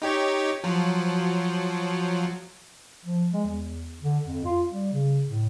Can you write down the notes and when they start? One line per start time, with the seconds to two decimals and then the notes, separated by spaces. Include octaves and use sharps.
0.02 D#4 G4 C#5
0.64 F3 F#3
3.05 F3
3.33 G#3
3.46 E2
4.02 D3
4.25 F2
4.44 F4
4.72 G3
4.93 C#3
5.27 A2